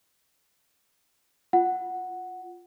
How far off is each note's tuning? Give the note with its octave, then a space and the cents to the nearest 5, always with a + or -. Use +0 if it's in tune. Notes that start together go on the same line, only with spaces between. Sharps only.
F4 +0 F#5 +0